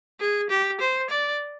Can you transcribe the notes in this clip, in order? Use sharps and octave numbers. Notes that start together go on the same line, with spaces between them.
G#4
G4
C5
D5